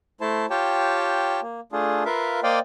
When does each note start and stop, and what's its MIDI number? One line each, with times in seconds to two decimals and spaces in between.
0.21 0.46 57
0.21 0.46 64
0.21 0.46 72
0.21 0.46 81
0.50 1.40 65
0.50 1.40 67
0.50 1.40 73
0.50 1.40 79
0.50 1.40 81
1.42 1.60 58
1.72 2.04 57
1.72 2.04 62
1.72 2.04 65
1.72 2.04 68
2.05 2.40 65
2.05 2.40 70
2.05 2.40 71
2.05 2.40 76
2.05 2.40 77
2.43 2.59 58
2.43 2.59 72
2.43 2.59 74
2.43 2.59 75
2.43 2.59 77
2.43 2.59 79